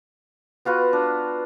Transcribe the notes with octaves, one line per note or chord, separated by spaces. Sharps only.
B3 F4 F#4 B4
D4